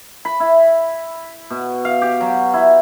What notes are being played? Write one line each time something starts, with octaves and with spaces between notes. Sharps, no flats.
B5
E4
B2
F5
G4
F#3
E4